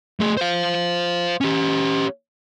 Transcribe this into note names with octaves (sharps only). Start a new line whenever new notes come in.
A3 G#4
C5 F5
C#4 G4